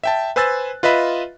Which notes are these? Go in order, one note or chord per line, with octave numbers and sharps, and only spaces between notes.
E5 G5 A5
B4 C5 G#5 E6 F#6 A6
F4 B4 D#5 E5 B5